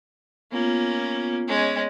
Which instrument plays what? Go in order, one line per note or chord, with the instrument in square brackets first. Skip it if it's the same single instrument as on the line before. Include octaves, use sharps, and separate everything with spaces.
[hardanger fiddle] A#3 C#4 [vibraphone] B3 F4
[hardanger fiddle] G#3 C#4 [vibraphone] B3 C#5 D#5